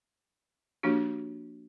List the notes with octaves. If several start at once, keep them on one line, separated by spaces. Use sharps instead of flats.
F3 A#3 D4 F#4 G4